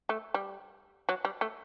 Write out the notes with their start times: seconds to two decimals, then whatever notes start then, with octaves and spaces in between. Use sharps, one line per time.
0.09 A3
0.34 G3
1.09 F#3
1.25 G3
1.41 A3